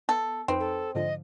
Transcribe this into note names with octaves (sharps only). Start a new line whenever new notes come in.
B3 A4
F2 C4 D#4 B4
A4
G#2 D3 F3 D#5